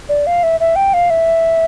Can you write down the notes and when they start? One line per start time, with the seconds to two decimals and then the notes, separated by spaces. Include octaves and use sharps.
0.09 D5
0.27 F5
0.43 E5
0.60 E5
0.76 G5
0.94 F5
1.10 E5